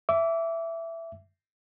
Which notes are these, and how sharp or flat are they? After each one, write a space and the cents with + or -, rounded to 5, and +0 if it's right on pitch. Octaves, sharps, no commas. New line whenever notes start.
E5 +10 D6 -25